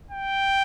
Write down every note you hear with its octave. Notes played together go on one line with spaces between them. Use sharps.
G5